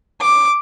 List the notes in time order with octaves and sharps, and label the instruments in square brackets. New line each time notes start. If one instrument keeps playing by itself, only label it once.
[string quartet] D6